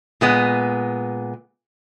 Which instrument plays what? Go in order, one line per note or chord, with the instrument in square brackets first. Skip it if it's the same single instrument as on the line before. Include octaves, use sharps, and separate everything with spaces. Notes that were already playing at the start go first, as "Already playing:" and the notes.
[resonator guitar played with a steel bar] A#2 G#3 B3